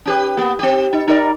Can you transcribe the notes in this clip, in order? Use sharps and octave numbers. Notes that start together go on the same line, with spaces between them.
C#4 G4 B4
A#3 B3
C4 G4
D#4
D#4 A#4 D5